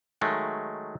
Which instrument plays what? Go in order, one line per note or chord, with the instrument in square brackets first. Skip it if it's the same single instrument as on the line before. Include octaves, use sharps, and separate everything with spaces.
[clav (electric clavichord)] D#3 F#3 G#3 A3